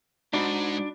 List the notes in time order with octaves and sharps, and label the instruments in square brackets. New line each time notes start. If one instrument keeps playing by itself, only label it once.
[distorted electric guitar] G#2 [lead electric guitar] D4 [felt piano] D#4 F#4 B5